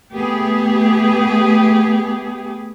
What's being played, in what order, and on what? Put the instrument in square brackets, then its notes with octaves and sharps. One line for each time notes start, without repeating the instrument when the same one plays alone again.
[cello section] A3 B3 G4 G#4